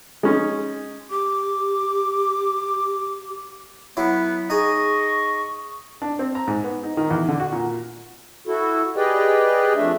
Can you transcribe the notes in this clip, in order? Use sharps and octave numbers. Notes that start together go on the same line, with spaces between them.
G#3 C#4 D#4
G4 D6
F#3 B3 E4
D#4 G#4 D#5 C#6
D4
C4
A#5
G#2
B3
D#4
D#3
E2
D3
F#4
A#2
E4 F#4 A4
G4 G#4 B4 D5 D#5 G5
F2 A3 D4 E5